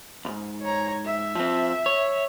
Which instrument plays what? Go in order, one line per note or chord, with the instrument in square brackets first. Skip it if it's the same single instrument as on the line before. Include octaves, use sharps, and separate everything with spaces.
[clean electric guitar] B1 G#2
[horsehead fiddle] C#5 A#5
E5
[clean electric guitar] F3 C4
C#5